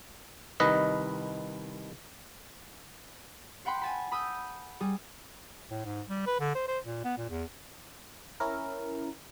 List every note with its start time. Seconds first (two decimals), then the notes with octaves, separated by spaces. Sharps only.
0.60 C2 D#3 B4 D#5
3.65 C5 F#5 G5 B5 C6
3.82 G#5 A5 B5
4.12 B5 D#6 E6 G6
4.80 G3 G#4
5.71 A2
5.85 G#2
6.09 G3
6.26 B4
6.40 D3
6.55 C5
6.68 C5
6.85 A#2
7.04 B3
7.17 A#2
7.30 E2
8.40 C#4 E4 A#4